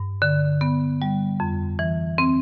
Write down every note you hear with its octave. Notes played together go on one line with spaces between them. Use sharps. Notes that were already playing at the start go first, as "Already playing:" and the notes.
Already playing: G2
D3
B3
G3
F2
E3
C4